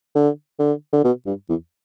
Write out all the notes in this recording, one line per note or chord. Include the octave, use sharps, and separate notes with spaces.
D3
D3
D3
B2
G2
E2